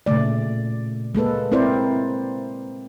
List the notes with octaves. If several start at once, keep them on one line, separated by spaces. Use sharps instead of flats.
A#2 C#3 A3 D5
G#3 A#3 A4 B4
C4 E4 A#4 C5 D5